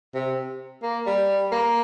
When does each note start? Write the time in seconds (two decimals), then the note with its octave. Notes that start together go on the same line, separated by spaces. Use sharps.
0.15 C3
0.83 A#3
1.06 G3
1.52 A#3